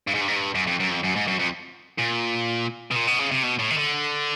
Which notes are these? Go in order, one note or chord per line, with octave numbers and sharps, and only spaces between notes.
G2
G#2
G2
G#2
G2
F#2
F2
F#2
F2
F#2
G#2
F#2
F2
A#2
B2
A#2
B2
C#3
C3
B2
A2
D#3
D3